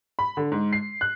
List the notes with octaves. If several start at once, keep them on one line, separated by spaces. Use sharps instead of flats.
B5
D3
G#2
C7
F#6